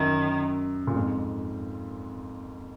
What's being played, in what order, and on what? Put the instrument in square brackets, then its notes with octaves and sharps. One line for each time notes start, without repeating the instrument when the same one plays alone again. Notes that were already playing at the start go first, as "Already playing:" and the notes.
Already playing: [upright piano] F#2 [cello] D#3
[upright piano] A#2
F2 G#2